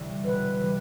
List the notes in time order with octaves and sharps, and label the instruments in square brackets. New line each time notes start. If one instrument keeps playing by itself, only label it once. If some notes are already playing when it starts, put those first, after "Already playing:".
Already playing: [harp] D2 C3 E3 G3
[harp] E1 [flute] B4
[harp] C3 E3 G3